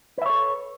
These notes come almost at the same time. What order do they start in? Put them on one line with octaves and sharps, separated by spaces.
B4 E5 C#5 A4